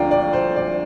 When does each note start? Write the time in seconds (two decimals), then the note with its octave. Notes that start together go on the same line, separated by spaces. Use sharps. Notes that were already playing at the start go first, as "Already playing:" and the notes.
Already playing: D2 D3 F3 D5 F5 G5 A#5
0.11 D5
0.33 C5
0.56 D5